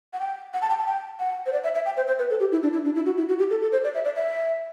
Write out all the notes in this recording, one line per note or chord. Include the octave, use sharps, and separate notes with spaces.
F#5
G5
F#5
A5
G5
A5
G5
F#5
C5
D5
E5
E5
G5
C5
C5
B4
A4
G4
E4
D4
E4
D4
E4
F#4
E4
F#4
G4
A4
A4
C5
D5
E5
D5
E5